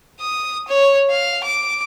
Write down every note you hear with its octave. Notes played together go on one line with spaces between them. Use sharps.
D#6
C#5
F5
D6